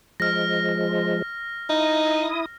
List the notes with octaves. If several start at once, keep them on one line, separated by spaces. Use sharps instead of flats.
F3 G#3 F6 A#6
D#4 E4 D#6